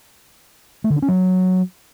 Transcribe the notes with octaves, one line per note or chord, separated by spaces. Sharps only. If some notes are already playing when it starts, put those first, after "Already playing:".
A3
D3
D4
C#4
F#3